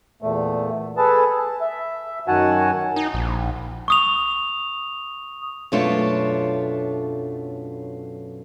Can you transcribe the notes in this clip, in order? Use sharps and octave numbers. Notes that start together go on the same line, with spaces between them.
E2 A#2 A3
G#4 A4 B4 A5
A5
E5
F#2 D#3 F#4 F#5 G#5 A5
D#4
A#1
C#6 D#6 F7
F#2 B2 A3 D4 F4 C#5